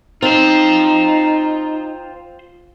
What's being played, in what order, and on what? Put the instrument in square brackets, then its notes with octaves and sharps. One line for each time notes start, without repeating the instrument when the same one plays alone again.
[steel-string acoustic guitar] C4 [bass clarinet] D#4 [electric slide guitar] F4 C5